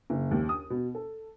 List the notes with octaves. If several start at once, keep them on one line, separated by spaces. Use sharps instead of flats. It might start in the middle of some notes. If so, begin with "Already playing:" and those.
F#1
D#2
D#6
B2
A4